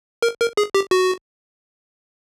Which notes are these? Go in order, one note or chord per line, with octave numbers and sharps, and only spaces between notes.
A#4
A#4
G#4
G4
F#4